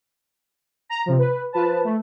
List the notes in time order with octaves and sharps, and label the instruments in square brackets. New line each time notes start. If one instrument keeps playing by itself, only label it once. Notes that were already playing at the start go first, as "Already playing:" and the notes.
[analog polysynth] A#5
C3 F3
B4
F3 B4 A5
A3